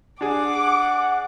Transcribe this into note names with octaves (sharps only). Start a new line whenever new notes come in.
D4 G#4 F#5 D6